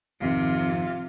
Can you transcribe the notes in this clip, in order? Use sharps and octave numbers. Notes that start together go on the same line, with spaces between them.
G#1 F2 C3 D#3 F4